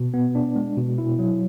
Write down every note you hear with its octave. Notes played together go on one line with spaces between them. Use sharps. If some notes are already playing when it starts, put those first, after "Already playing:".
Already playing: B2
B3
D4
G#3
B2
E4
F#3